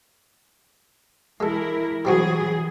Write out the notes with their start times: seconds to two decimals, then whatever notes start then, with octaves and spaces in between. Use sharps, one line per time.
1.40 E3 G#3 E4 A4 A#4
2.05 E3 F#3 G3 C4 F#4 G#4